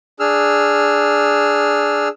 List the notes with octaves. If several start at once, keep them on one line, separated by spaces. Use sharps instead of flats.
D4 G#4 E6 F6